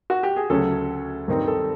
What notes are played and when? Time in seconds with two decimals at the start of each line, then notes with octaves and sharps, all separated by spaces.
0.10 F#4
0.23 G4
0.36 G#4
0.50 D2 C#3 F#3 A3 C#4 A4
1.28 G2 D#3 G3 C4 D#4
1.47 A4